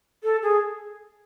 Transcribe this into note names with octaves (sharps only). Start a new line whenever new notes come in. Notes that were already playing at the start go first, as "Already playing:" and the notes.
A4
G#4